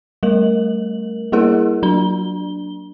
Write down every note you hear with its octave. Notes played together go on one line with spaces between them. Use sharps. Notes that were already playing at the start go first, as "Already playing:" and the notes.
G3 A3 A#4 F#7
G3 A#3 E4 G#4 A#4 F#5
F#3 D4 G7